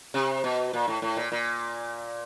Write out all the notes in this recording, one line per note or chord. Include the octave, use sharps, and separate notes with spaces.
C3
B2
A#2
A2
A2
A#2
A#2